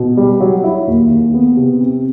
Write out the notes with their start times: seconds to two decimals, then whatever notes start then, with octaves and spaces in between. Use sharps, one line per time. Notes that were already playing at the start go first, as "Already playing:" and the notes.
Already playing: B2
0.17 G3
0.40 F#3
0.64 E4
0.87 D#2
1.11 D#2
1.34 B3
1.57 C3
1.81 C4